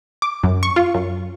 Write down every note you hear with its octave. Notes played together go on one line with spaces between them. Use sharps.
D6
F#2
C#6
F4
F#2